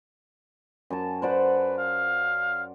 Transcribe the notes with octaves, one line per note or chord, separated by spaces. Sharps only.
F#2 A5
B4 C5 D5 F#5
F5